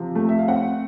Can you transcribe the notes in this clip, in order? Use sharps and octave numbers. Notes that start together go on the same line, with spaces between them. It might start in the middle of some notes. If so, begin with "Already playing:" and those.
Already playing: C3 F3
A3
E5
F5
C4 F#5